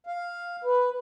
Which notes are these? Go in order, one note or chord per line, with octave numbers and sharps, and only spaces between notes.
F5
B4